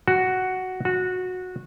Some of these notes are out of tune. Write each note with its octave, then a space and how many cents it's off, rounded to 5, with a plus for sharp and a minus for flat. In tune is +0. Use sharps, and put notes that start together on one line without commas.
F#4 +5
F#4 -15